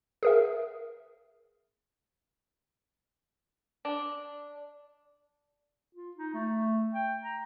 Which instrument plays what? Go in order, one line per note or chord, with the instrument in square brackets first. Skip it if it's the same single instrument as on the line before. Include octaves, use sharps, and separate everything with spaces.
[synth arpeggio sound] G#4 A#4 E5
[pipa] D4
[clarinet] F4
D#4
A3
G5
A#5